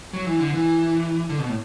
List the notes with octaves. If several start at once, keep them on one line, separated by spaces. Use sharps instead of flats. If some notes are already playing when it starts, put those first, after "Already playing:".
F#3
E3
D3
E3
D3
B2
A2